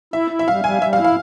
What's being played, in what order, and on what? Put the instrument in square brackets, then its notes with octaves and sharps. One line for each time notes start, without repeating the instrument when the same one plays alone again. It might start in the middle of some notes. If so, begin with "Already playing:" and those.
[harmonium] E4 [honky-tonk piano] E5
[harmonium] E4
[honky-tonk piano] E5
[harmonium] G3 [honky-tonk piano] F5
[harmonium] G3 [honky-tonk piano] G#5
[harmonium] G3 [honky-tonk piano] E5
[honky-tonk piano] F5
[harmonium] E4
[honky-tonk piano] F5